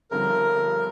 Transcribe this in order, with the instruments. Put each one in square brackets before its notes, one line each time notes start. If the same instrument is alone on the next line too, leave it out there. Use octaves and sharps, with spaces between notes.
[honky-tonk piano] G1 G2 D3 F3 [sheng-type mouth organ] A#4